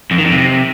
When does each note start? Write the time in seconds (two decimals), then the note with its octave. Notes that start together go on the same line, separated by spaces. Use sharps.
0.11 F2
0.18 D#3
0.25 F2
0.32 C3